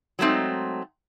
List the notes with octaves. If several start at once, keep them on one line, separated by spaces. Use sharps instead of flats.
F#3 G#3 A3 C4 D#4